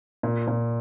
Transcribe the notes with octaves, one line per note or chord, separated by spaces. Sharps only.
A#2
A#2